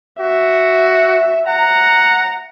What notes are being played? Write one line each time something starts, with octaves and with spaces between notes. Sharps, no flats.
F#4 E5
F#5 A#5